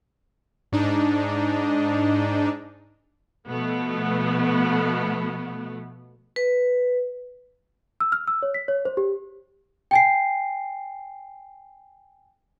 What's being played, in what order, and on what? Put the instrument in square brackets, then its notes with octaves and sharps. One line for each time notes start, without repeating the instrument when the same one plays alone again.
[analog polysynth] G#2 D4 D#4
[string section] B2 F3 A3 B3
[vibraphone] B4
[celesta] E6
F6
E6
C#5
B6
C#5
C5
G4
G5 G#5 C7